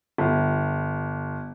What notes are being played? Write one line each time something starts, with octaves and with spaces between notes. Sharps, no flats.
G1